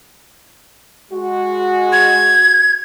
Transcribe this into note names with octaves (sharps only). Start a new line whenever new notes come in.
G#3 F#4
G#6